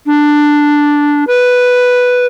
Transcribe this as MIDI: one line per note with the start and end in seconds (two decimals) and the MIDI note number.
0.06 1.24 62
1.27 2.26 71